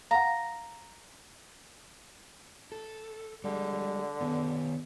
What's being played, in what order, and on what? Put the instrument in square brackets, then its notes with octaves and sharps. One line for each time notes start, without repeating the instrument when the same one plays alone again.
[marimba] F5 F#5 [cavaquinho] A#5
[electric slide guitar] A4
[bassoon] D3 [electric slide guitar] G3 G#3
[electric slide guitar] D#3 B3